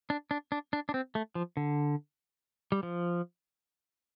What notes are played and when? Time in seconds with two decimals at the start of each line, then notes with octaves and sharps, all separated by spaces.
0.10 D4
0.31 D4
0.52 D4
0.73 D4
0.89 D4
0.94 C4
1.15 A3
1.35 F3
1.57 D3
2.72 G3
2.83 F3